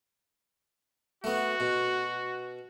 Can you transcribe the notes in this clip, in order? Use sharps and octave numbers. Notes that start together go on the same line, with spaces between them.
A3 B3 F#4
B2